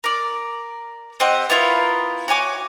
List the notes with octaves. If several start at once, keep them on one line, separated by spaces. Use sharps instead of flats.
A#4 D5
C4 G4 D#5 F#5
B3 E4 F4 A#4
F#4 C#5 G#5 D6